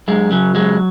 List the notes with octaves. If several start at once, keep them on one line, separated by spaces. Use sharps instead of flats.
F#2 G#3
C#3 F#3
F#3 G#3